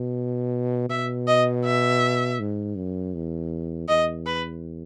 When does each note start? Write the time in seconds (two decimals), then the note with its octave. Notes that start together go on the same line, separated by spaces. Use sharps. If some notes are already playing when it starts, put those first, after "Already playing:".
Already playing: B2
0.89 B2 E5
1.27 D#5
1.65 E5
2.40 G#2
2.76 F#2
3.15 E2
3.88 E2 D#5
4.26 B4